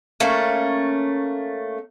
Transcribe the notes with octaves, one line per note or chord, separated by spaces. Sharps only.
A3 A#3 C#4